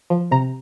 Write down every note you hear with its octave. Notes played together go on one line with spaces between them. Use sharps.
F3
C3 A#5